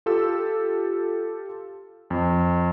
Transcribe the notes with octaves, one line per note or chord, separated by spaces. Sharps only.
F4 G4 A4 E6
F2